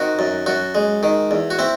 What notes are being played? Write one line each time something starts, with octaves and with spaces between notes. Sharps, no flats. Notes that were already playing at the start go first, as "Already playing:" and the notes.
Already playing: D#3 C4 F#4
F#2
F#2 F#4
G#3
D#3
E2
F#4
C4 E4